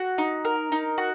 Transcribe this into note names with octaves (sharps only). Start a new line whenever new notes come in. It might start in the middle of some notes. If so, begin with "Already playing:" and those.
Already playing: F#4
D#4
A#4
D#4
F#4